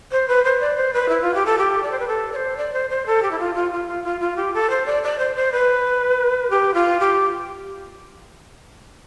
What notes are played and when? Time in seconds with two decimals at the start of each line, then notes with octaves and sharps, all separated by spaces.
0.12 C5
0.28 B4
0.44 C5
0.60 D5
0.76 C5
0.93 B4
1.09 E4
1.22 F4
1.35 G4
1.46 A4
1.58 G4
1.83 D5
1.91 C5
1.99 B4
2.08 A4
2.32 D5
2.36 C5
2.57 D5
2.73 C5
2.90 C5
3.06 A4
3.23 G4
3.31 E4
3.39 F4
3.55 F4
3.72 F4
3.88 F4
4.04 F4
4.20 F4
4.36 G4
4.54 A4
4.70 C5
4.86 D5
5.03 D5
5.19 C5
5.36 C5
5.52 B4
6.50 G4
6.74 F4
7.00 G4